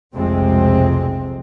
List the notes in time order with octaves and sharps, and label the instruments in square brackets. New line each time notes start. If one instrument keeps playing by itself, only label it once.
[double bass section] F1 B1 F2 C3 G#3 C4